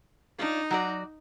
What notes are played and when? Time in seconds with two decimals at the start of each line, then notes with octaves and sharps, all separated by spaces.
0.39 D4 D#4 F4
0.71 F#3 F#4 D5